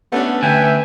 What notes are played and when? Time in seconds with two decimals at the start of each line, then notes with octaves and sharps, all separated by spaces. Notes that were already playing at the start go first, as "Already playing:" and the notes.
0.12 A3 B3 C#4 D4
0.42 D2 B4 E5 G5 G#5